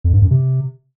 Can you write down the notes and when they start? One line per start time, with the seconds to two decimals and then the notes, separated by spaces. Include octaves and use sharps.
0.04 F2
0.13 G2
0.22 F#2
0.31 C3